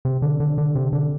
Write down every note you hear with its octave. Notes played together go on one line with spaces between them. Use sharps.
C3
D3
D3
D3
C3
D3